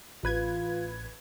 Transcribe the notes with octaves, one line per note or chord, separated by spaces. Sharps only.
A1 F4 B4 G#6